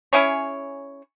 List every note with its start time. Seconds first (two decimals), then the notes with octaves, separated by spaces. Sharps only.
0.13 C#4 E4 G#4 C#5